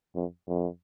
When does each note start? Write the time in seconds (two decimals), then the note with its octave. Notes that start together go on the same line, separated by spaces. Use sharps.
0.15 F2
0.48 F2